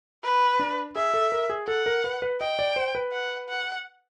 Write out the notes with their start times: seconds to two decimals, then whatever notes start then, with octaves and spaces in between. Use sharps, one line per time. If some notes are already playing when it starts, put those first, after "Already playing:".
0.24 B4
0.59 D4
0.95 G#4 E5
1.14 A4
1.32 A#4
1.50 G#4
1.67 A4 F#5
1.86 A#4
2.04 B4
2.22 B4
2.40 D#5 G5
2.59 D5
2.76 C5
2.95 B4
3.12 F#5
3.49 F#5